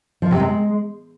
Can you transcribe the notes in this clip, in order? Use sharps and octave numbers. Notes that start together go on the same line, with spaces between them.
F3
C3
G#3